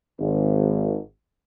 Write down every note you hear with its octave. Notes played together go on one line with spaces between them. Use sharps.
G#1